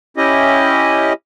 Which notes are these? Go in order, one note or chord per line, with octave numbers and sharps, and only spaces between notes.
C#4 E4 G4 D#5